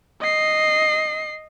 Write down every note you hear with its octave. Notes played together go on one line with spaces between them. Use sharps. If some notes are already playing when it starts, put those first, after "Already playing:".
D#5 C7